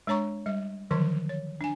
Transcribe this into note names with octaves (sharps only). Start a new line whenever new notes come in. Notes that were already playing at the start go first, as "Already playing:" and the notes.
G#3 D4 C#5 A#5 C#6
G3 E5
D3 D#3 F3 F#3 C#6
C#5
D4 G#5